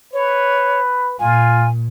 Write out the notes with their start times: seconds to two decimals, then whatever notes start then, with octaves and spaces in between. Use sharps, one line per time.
0.13 B4 C#5
1.20 A#2 F4 G#5